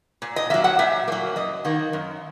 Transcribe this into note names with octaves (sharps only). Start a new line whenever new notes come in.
A#2
D#5
F#3 A#3 E5
F#5
A#2 E5
F#3 A#3
F#2 D#5
D#3 A#3
F#2